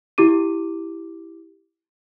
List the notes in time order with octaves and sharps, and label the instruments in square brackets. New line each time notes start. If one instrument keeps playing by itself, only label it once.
[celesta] E4 G4 D6 D#7